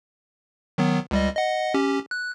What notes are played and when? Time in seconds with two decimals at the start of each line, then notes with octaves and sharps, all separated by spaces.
0.78 D#3 F#3 B3
1.11 C#2 G3 D#5
1.37 D#5 F#5
1.74 C#4 G4
2.11 F#6